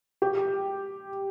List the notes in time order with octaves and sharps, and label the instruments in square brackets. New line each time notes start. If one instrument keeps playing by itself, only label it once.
[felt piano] G4